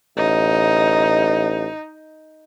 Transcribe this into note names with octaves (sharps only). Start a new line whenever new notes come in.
A1 D#4